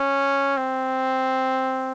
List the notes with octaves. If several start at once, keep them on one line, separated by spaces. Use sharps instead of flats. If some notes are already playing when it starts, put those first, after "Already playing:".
Already playing: C#4
C4